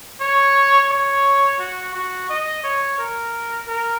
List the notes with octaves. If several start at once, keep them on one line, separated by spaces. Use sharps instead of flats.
C#5
C#5
F#4
F#4
D#5
C#5
A#4
A#4